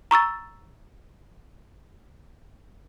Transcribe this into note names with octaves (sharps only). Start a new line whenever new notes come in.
A#5 C#6 E6 A6